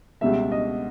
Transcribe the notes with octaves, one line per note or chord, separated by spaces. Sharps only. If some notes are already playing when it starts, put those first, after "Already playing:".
C#2 B2 G3 E5
D#5